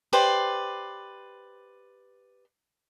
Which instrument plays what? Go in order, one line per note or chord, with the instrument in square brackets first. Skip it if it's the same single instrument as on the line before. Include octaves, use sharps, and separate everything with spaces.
[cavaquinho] G4 B4 C5 D5